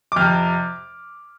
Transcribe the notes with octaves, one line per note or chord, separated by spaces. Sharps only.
D6
F2 C3 F6